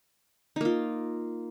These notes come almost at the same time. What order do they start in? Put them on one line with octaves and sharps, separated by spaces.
D#4 A#3 F4